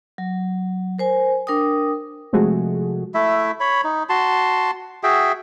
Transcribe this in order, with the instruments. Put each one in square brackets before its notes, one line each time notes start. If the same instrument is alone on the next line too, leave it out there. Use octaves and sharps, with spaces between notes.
[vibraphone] F#3
A#4 C5 G#5
D4 A#4 G5 D#6
[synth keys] C3 F3 G#3 A3 F#4 G#4
[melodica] A3 E4 E5
C#5 B5
D#4
F#4 A5 C6
F#4 G#4 E5 G5